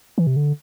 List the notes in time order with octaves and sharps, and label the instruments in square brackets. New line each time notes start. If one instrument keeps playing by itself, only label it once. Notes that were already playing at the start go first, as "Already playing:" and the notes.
[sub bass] E3
C3
D3